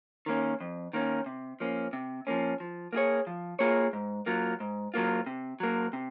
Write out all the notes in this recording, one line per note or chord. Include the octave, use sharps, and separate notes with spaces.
D#3 A#3 C#4
F2
D#3 A#3 C#4
C3
F3 A#3 C#4
C3
F3 A#3 C#4
F3
A#3 F4 G#4 C#5
F3
A#3 F4 G#4 C#5
G#2
F#3 A#3 F4
G#2
F#3 A#3 F4
C3
F#3 A#3
C3